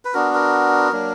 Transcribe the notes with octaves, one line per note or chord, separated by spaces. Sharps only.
B4
B3 D4 F#4 A#4
A#4
F#3 A#3 D4